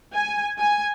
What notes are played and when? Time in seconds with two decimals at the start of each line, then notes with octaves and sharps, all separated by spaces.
0.14 G#5
0.59 G#5